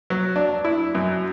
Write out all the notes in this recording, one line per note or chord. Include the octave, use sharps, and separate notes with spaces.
F#3
D4
E4
F#2